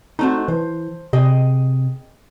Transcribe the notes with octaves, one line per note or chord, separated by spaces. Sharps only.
A3 C4 D#4 F#4
E3 C5
C3 G#4 D#5 G5